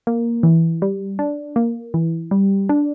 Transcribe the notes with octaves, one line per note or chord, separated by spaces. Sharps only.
A#3
E3
G3
D4
A#3
E3
G3
D4